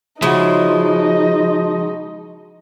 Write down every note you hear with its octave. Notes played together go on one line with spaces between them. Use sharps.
C#3 F3 G#3 D#4 E4 F#4 D#6